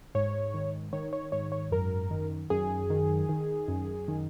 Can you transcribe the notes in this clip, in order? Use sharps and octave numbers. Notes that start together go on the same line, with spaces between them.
G#2 C#5
D#3
D#3 C#5
C#5
G#2 C#5
C#5
F#2 A#4
D#3
F#2 G#4
D#3
D#3
F#2
D#3